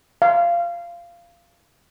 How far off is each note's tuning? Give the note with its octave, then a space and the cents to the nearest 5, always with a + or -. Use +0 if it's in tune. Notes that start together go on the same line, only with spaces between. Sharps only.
F5 -20